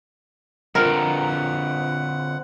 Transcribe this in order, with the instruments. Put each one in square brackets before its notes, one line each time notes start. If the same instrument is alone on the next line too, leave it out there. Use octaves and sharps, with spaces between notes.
[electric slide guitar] D3 C4 F4 [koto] A#4 [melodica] F#5